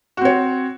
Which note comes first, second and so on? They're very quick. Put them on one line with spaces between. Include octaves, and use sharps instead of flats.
F#4 C4 C#5